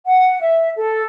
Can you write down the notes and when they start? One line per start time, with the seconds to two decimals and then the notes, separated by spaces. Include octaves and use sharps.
0.06 F#5
0.41 E5
0.77 A4